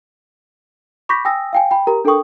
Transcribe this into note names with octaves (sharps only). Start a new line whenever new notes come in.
B5 C#6 D6 G6 A#6 B6
G5 G#5 D#6 E6 A#6
F5 G5 G#5
G5 B5
G4 A#4 A#5
D4 A4 A#4 G5 C#6 D#6